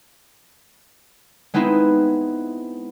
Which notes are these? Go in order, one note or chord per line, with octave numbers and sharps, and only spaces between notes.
G#3 B3 C4 D#4 E4